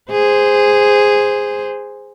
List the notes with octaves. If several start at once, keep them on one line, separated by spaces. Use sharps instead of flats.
G#4 C5